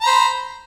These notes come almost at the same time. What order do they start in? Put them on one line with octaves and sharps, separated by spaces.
A#5 B5 C5